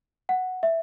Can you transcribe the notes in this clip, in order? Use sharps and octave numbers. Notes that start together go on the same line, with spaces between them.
F#5
E5